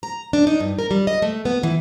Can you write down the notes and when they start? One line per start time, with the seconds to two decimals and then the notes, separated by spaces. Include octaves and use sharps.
0.03 A#5
0.33 D4
0.47 D#4
0.60 G2
0.79 A#4
0.91 G3
1.07 D#5
1.22 A3
1.45 B3
1.63 E3